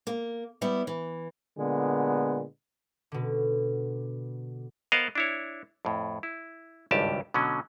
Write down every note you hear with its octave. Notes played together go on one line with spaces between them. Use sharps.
A#3
G3 B3 E4 G4
E3
A#2 D3 G#3 B3
B2 D3
B3 A#4 C5 D#5 F5 F#5
D4 E4 C#5
F2 A2
E4
G#1 C#2 G2 G4 A5
B2 D3 F#3 C#4